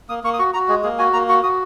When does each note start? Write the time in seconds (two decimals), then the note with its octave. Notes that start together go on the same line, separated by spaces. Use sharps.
0.09 A#3 D#6
0.24 A#3 C#6
0.34 D#6
0.39 F#4 C#6
0.54 F#4 A#5
0.68 G#3 G#4
0.83 A#3 G#4
0.99 F#4 G#5
1.13 A#3 A#5
1.28 F#4 C#6
1.43 F#4 D#6